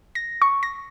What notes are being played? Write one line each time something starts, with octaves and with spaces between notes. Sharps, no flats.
A#6
C#6
A#6